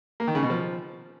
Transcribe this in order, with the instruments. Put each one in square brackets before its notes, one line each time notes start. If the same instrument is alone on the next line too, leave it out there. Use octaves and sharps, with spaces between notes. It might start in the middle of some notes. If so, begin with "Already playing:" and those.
[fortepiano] A#3
D#3
C#3
B2
F3